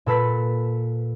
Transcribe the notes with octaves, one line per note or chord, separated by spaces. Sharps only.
A#2 A4 B4 B6